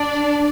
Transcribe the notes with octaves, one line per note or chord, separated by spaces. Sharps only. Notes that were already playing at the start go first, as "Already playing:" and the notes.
Already playing: D4 D5